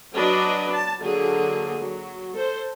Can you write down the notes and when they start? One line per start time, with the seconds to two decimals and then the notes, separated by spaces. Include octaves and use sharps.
0.16 F#3 D4 B4 D#5
0.72 A5
1.03 D3 F#3 A#3 G#4
1.81 F#3
2.34 A4 C5